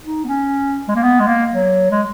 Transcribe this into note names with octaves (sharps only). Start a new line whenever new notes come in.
D#4
B3
C#4
G#3
A#3
B3
G#3
A#3
F#3
G#3